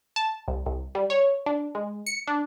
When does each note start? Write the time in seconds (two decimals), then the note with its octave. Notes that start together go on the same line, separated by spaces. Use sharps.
0.16 A5
0.48 C2
0.66 C2
0.95 G3
1.10 C#5
1.46 D4
1.75 G#3
2.06 C#7
2.27 D4